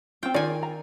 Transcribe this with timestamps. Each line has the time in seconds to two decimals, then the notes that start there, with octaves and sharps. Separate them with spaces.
0.23 C4 F4 G5
0.34 D#3 F4 G#4 D5 G#5
0.63 A#5